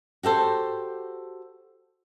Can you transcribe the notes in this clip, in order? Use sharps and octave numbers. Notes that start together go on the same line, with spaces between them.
F#4 G4 A4 C5